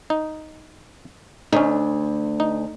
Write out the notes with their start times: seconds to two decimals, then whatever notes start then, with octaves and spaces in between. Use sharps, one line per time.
0.10 D#4
1.53 D2 C#4 D#4
2.40 D#4